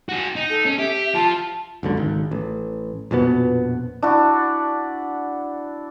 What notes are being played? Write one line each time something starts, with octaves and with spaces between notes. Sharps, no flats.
F#4 G#4
D#4
A4
C#4
G4 E5
F3 A5
F#1 C#2 D3
G#1
A1
A#1 F2 B2 B3
D4 E4 F#4